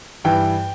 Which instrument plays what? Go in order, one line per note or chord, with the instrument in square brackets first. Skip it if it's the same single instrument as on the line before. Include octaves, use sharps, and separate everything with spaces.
[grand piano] G2 E3 G5